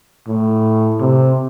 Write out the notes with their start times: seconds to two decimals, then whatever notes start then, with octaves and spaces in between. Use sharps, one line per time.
0.27 A2
1.00 C3